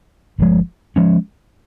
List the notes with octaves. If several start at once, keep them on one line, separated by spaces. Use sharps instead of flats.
G1 G2 F3 G#3
F3 G#3 C#4